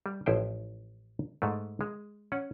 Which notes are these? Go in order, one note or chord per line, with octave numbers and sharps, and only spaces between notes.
G3
A1 F3 E4 C5 G5
G#2 G#3 A3
G#3
C#4 F#5